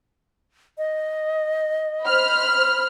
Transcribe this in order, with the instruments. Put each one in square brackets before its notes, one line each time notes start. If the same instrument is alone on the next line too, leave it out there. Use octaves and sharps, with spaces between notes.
[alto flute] D#5
[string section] C5 B5 F6